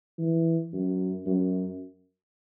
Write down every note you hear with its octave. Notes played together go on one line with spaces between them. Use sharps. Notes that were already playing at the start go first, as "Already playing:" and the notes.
E3
F#2
F#2